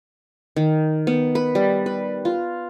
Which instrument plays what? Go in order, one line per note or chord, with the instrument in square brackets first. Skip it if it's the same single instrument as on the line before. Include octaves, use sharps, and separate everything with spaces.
[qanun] D#3
B3
B4
G3
B4
F4